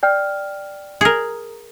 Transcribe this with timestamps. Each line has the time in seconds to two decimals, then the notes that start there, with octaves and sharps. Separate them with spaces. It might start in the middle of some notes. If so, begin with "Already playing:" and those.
0.03 D5 G5 F6
1.01 G#4 A#4